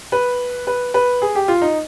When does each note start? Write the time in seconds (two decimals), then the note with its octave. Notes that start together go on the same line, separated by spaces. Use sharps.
0.12 B4
0.67 B4
0.94 B4
1.22 G#4
1.35 G4
1.48 F4
1.62 D#4